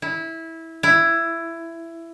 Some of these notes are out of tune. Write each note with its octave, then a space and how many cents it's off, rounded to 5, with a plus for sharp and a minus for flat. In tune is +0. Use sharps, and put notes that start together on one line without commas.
E4 -15
E4 +15